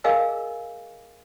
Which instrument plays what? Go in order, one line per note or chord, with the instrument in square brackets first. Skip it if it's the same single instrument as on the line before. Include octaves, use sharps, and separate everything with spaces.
[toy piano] G#4 A#4 D#5 F5 G#5 E6